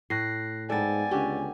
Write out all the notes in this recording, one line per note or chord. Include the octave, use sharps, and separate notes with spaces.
A2 F#6 A#6 C7
G#2 B3 A4 D5 G5 G#5 A6
C#2 D3 C#4 G4